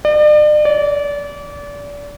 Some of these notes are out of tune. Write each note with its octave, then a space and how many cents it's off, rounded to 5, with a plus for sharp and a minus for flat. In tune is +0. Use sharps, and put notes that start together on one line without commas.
D5 +40
D5 -30